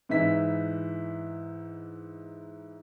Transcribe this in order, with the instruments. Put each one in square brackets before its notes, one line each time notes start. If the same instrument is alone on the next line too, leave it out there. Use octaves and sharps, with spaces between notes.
[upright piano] G#2 E3 D#4 E4 B6